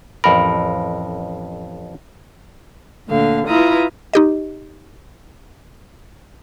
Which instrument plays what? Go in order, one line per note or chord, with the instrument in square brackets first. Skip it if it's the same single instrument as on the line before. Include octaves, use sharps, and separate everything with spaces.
[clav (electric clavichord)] A1 F2 A#4 [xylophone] B5
[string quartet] D2 A#2 D3 F5
E4 F4 B4 A#5 D#6
[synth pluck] D#4 G4 D#5